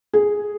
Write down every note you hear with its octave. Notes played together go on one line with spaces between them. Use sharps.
G#4